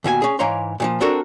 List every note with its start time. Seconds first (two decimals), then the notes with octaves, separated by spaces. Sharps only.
0.04 D#2 B2 F#4 G#5
0.22 C#4 G#4
0.39 G#2 E3 C#5 F5 A#5 C6
0.80 A#2 D#3 F3
1.00 C4 D4 F#4 A4 A#4